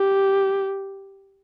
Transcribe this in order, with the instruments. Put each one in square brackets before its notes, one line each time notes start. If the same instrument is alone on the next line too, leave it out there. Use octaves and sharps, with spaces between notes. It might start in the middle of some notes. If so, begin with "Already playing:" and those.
Already playing: [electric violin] G4